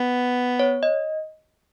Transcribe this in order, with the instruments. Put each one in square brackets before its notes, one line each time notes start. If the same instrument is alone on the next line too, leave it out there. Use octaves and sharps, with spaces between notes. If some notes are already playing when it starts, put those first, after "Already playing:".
Already playing: [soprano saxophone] B3
[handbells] C#5
D#5